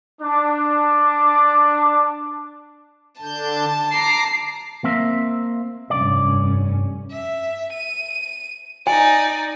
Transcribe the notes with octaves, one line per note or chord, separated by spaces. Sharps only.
D4 D6
D3 D4 A5 G6
A#5 D6 C7
A#3 C4 E5
F1 G2 C#4 D5
E5
D#7
D#4 D5 G#5